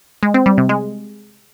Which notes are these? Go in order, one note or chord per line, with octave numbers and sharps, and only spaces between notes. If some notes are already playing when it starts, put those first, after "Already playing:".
G#3
C4
G3
C3
G#3